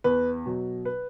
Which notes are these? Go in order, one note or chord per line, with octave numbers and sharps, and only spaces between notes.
E2 B4
B2 F#3
B4